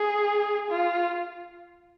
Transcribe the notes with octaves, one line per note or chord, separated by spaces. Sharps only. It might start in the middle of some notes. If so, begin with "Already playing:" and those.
Already playing: G#4
F4